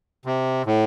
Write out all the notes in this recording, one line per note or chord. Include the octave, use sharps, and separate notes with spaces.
C3
A2